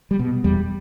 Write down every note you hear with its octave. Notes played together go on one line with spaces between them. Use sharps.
G3
B2
E2 G3